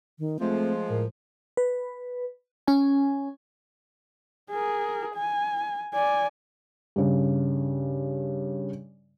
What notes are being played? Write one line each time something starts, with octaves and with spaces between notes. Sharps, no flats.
D#3
F3 G#3 A3 C4
A2 A#4
B4
C#4 G#5
G#4 A#4
G#5
D5 G#5
G2 C#3